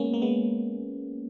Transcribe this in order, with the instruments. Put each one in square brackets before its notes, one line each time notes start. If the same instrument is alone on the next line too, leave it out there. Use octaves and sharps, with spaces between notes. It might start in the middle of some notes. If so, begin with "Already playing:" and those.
Already playing: [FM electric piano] G#3 A#3 B3 C#4
A#3
G#3 B3